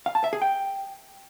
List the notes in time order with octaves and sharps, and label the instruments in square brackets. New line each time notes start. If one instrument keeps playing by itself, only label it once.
[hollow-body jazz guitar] F5
A5
E5
G#4
G5